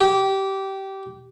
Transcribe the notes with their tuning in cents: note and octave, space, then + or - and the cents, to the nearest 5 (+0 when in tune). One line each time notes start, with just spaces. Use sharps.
G4 -20